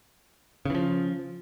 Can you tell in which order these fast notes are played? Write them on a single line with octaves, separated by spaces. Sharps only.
C#3 E3 F3